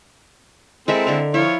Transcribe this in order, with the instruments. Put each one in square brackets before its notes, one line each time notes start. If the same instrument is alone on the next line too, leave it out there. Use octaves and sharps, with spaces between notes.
[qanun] G#3 A#4 E5 [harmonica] C4 E4 A4
[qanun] D3 A#4
[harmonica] F3 F4 C#5 [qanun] E4